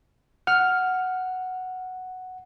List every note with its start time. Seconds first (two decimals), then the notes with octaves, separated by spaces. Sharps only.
0.47 F#5 F6